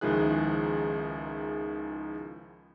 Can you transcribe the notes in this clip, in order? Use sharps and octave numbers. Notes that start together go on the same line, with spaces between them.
C#2 D#3 F3 E4 G#4 F#6